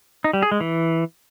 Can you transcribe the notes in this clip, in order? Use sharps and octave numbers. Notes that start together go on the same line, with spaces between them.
D#4
G3
G#4
G#3
E3